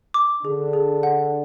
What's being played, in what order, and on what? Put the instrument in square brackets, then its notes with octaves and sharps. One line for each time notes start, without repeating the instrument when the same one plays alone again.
[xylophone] D6
[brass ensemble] D3 D4 [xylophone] G#4
[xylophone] G#4
F#5